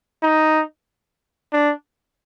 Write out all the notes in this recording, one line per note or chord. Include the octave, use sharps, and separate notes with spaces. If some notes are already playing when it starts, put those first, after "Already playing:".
D#4
D4